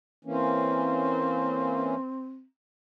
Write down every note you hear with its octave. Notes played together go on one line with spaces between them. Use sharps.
E3 A#3 C4 C#4